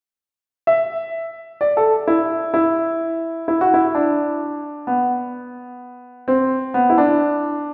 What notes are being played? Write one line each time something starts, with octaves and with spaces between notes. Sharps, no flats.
E5
D5
A4
E4
E4
E4
F#4
E4
D4
B3
C4
B3
E4
D4